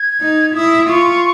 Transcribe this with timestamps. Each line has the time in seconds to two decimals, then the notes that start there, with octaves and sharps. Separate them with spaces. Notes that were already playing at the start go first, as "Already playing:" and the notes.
Already playing: G#6
0.21 D#4
0.55 E4 D#6
0.90 F4 C#6